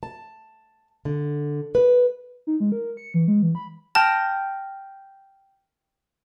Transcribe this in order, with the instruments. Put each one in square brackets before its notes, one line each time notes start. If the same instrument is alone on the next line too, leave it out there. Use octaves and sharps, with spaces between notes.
[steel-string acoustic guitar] A5
D3
B4
[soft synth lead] D#4
G#3
A#4
C#7
E3
G#3
E3
B5
[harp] G5 F6 A#6 [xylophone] A5